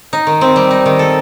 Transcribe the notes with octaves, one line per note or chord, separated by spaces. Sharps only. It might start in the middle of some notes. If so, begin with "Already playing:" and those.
D#4
D#3
C4
G3
D#4
D#3
A4